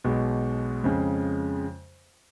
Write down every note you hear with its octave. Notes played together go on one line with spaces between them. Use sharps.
B1 B2 G#3
F2 C#3 G#3